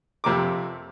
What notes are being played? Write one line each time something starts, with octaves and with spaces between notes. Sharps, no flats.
F2 C3 A#4 D6